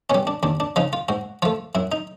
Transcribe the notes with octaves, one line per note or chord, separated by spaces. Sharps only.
B2 G3 C#4
D4
D#2 D4
D4
C#3 F3 D#4
F4
G#2 F#4
F3 A3 F4
F#2 E4
D#4